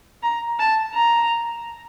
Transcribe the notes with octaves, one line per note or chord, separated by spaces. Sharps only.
A#5
A5
A#5